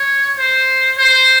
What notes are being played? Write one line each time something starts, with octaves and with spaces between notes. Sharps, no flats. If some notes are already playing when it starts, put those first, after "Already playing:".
Already playing: C#5
C5
C5